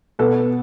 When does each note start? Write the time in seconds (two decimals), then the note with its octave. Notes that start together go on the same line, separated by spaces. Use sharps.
0.19 B2 A4 B4